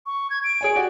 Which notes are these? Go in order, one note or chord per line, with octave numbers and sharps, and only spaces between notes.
C#6
G#6
D7
G#4 C#5 G#5
F#4 G4 D5